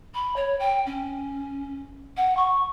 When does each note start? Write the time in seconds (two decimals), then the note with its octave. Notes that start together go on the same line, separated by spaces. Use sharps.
0.14 B5
0.36 C#5
0.59 G5
0.86 C#4
2.17 F#5
2.37 C#6